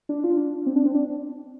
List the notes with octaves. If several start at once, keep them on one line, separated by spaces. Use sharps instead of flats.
D4
F4
D4
C4
D4
C4
D4